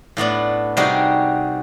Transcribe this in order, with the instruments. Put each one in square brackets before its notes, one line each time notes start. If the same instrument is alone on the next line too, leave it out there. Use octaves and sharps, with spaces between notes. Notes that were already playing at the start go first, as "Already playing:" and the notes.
[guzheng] A2 A3 B3 D4
C3 G3 D#4 F#4 G#4